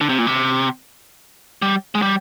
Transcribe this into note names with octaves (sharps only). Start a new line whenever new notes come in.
D3
C3
A#2
C3
G3
G#3
G3